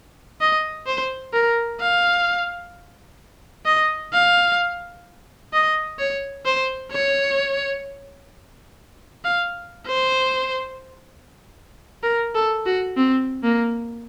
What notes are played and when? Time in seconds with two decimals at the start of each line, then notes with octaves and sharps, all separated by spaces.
0.41 D#5
0.87 C5
1.34 A#4
1.81 F5
3.66 D#5
4.13 F5
5.53 D#5
5.99 C#5
6.46 C5
6.92 C#5
9.25 F5
9.87 C5
12.04 A#4
12.35 A4
12.66 F#4
12.97 C4
13.43 A#3